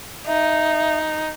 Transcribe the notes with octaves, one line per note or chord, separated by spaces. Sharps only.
D#4 E5